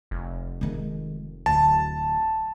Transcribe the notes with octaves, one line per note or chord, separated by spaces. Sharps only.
F1
D#3 G#3
D1 A5